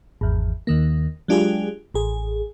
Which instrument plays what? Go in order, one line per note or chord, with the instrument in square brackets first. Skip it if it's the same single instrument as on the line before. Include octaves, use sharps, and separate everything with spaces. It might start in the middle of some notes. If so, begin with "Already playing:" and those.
[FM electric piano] G#1 E2
D#2 D#3 A#3
F#3 G#3 D4 F4 G4 G#4
A1 G#4